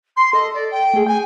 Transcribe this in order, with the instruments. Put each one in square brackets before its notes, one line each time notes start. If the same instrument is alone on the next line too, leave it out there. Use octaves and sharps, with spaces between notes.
[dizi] C6
[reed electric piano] A4 [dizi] D#5
[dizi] D5
G5
[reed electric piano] A3 G#4
[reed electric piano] G5 [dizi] G#5